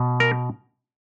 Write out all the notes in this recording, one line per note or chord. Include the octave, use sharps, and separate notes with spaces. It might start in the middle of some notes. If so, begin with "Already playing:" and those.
Already playing: B2
A#4